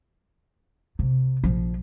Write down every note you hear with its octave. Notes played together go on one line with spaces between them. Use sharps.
C3
A#1 F3